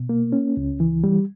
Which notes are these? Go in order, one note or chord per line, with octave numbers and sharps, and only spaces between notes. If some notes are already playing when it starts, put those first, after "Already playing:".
Already playing: B2
A#3
C#4
C#2
E3
G3